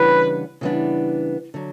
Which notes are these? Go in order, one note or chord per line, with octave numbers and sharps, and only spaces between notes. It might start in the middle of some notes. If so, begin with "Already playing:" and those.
Already playing: C#3 E3 G3 B3 D4 B4
C#3 E3 G3 B3 D4
D3 F#3